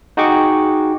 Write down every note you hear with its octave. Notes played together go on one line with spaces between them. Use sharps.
D#4 F#4 G#4 G5 C#6 D6